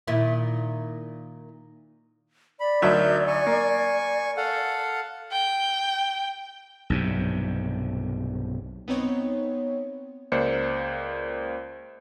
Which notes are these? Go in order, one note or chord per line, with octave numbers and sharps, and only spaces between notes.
A#2 D#3 E4
D5 B5
D2 F#3 D#4 A#4 E5 G6
G#5 C#6
A#3
A4 F5 F#5
G5
B1 G2 C3
B3 C4 D#4 C#5
C#2 A#3 C5 D5 C#7